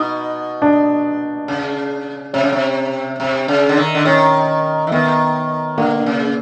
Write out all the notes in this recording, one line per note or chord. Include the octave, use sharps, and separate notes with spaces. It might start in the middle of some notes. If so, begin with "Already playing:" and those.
Already playing: B2 D#4
D4
C#3
C3 C#4
C#3
C3
C3
C#3
D3
D#3
D3
D#3 C#4
E3
D#3 B3
D3 A#3
C#3